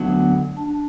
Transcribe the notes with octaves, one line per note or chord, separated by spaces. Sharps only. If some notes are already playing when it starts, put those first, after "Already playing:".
Already playing: D2 D3 F#3 B3
D4